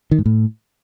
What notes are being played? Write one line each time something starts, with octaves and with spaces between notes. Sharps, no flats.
D#3
G#2
A2